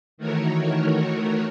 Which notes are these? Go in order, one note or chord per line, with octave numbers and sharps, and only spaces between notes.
D#3 E3 A3 F#4 A#4 C#5